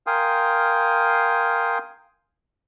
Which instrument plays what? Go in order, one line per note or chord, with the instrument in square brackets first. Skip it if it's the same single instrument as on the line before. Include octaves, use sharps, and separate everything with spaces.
[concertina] A#4 F5 G5 G#5 C6 D#6